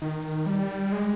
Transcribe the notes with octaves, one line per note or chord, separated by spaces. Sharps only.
D#3
G3
G#3